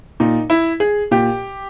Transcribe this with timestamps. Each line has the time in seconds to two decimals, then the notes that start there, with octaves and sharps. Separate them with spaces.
0.20 A#2 D#4
0.50 E4
0.80 G#4
1.11 A#2 G4